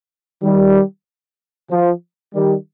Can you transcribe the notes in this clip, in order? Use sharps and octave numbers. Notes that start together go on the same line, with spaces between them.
D#3 G3
F3
D#3 G3